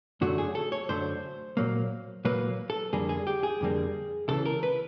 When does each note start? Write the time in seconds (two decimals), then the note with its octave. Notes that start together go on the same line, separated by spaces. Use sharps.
0.21 F#2 D3 F#3 A3 F#4
0.38 G#4
0.55 A4
0.72 C#5
0.89 F#2 D3 F#3 A3 C5
1.57 A#2 F#3 A#3
2.25 A#2 F#3 A#3 B4
2.70 A4
2.93 F2 D3 G3 A#3 G#4
3.09 G#4
3.27 G4
3.43 G#4
3.61 F2 D3 G3 A#3
4.28 C#2 C#3 E3 A4
4.45 A#4
4.63 B4